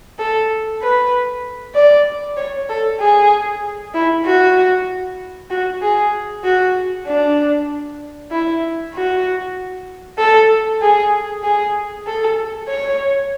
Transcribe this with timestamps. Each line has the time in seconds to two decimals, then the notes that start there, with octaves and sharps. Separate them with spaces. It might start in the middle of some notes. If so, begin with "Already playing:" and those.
0.19 A4
0.82 B4
1.75 D5
2.37 C#5
2.69 A4
3.00 G#4
3.94 E4
4.25 F#4
5.50 F#4
5.81 G#4
6.44 F#4
7.07 D4
8.31 E4
8.93 F#4
10.18 A4
10.82 G#4
11.43 G#4
12.07 A4
12.68 C#5